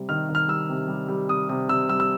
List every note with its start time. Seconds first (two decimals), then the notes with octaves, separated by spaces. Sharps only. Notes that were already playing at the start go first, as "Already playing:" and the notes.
Already playing: C3 G3
0.09 D#3 F6
0.29 D#3
0.35 F6
0.48 G3 E6
0.69 C3
0.88 G3
1.08 G3
1.29 C3 D#6
1.49 C3 D#6
1.69 C3 E6
1.89 G3 E6
2.00 E6